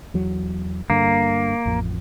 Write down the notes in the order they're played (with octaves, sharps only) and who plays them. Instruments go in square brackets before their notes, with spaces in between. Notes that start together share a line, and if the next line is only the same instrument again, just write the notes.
[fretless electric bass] E2 F#3
[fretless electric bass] G2 D3 [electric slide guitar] A#3
[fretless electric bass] A1 F2